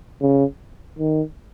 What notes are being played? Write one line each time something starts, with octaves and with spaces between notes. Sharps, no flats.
C#3
D#3